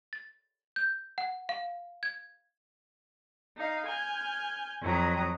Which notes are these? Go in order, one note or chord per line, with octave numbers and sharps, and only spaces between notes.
A6
G6
F#5
F5
G#6
D#4 F5
G#5 F6 G6
F2 F#3 A#5 D#6